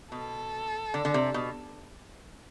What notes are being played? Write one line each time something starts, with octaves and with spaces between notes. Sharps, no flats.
B2 A4
D3
D3
C3
B2